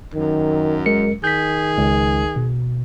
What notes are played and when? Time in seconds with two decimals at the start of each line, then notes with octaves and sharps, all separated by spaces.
0.14 F#2 D#3
0.86 G#3 A#4 C#7
1.24 D#3 G#4 G6 B6
1.78 C#2
2.36 B2